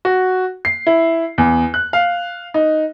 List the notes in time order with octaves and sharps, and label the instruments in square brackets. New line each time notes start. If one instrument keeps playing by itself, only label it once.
[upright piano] F#4
C7
E4
E2
F#6
F5
D#4